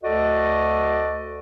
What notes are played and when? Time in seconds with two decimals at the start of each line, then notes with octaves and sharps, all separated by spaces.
0.03 D2 F#4 A4 D5 D#5